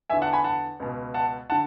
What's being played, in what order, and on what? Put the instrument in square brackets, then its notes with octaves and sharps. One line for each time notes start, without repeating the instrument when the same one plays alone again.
[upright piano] E2 D3 E5 G#5
F#5 A5
G#5 B5
F#5 A5
C#2 B2
F#5 A5
D3 F#5 A5